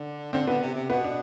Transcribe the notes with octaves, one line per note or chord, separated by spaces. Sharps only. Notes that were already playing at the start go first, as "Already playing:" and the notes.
Already playing: D3
D3 C4
D3 B3
C3
C3
B2 B3
D4